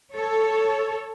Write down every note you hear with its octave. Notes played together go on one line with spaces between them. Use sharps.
A4 C#5